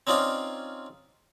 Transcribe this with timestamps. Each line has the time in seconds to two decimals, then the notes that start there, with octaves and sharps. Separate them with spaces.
0.07 C4 C#4 D#4 F4 D5 F5